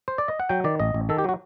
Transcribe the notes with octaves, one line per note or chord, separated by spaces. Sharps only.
C5
D5
D#5
F#5
F#3 G5
D#3 D5
A1 D#5
A1
D#3 A4
G4
F#3 F#4